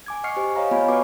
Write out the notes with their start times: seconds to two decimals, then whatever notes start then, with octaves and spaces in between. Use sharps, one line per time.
0.06 G#5 D6 G#6
0.24 D#5 F#5 C#6 F6 C7 C#7
0.37 G4 C5 G#5
0.55 C#5 D#5 F5 A#5 F6
0.71 B3 F4 C#5 G#5 B5
0.88 B3 F#4 B4 G#5 C#6 D6